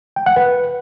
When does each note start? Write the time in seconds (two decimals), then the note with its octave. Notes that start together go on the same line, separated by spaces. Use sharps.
0.16 G5
0.26 F#5
0.36 B4